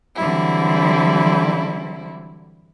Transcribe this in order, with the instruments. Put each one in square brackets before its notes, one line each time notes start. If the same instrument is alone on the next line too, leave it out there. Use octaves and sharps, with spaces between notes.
[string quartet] D3 E3 F#3 G3 C4 E4